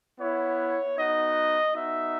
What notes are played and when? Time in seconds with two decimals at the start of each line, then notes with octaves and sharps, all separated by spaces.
0.19 B3 E4 C#5
0.96 B3 D#4 F#4 D#5
1.73 B3 D#4 F#4 E5